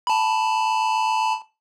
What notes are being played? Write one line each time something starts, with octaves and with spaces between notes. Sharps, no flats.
A5 B5